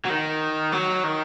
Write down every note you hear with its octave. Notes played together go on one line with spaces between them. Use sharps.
F#3
D#3
F#3
D#3